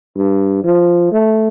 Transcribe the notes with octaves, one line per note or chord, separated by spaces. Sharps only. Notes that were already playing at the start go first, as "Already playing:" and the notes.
G2
F3
A3